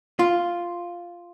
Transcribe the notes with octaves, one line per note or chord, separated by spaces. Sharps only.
F4